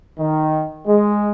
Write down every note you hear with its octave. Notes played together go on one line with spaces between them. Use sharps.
D#3
G#3